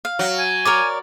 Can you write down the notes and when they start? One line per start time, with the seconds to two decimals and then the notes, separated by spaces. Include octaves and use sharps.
0.05 F5
0.19 F#3
0.38 G#5
0.65 A#4 C#5 D5 D6